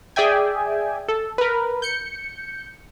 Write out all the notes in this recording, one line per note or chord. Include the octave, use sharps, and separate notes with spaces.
G#4 D5 E5 G5 G#5
A4
A#4 B4
G6 C#7